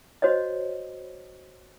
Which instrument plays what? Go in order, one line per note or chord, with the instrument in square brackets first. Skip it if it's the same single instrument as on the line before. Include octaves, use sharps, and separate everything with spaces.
[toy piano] F#4 C5 C#5 D#5